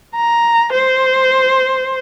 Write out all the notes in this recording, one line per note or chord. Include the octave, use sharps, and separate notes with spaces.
A#5
C5